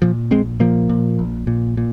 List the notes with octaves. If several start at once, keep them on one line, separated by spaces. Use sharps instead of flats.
A#2 F3
A#1 G#3 C4
A#2 F3 A#3
A#2
A#1
A#2
A#2